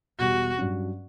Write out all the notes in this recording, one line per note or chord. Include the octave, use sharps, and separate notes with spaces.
E1 E2 B2 G3 F#4
G2 F#3 C#4 F#4